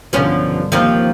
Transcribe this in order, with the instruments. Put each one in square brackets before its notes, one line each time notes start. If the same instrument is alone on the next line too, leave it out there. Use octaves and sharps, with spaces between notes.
[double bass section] B1 G2 D3 [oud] F3 B3 C#4
[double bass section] D#2 A#3 [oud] D#3 F3 C4